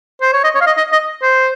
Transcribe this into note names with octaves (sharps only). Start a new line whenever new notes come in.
C5
C#5
D#5
C#5
F5
D#5
D#5
D#5
C5